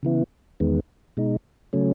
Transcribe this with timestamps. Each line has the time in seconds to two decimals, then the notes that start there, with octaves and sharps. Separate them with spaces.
0.03 C#3 E3 B3 E4
0.60 E2 D#3 G#3 B3
1.17 B2 G#3 D#4
1.73 C#3 F#3 A3 C#4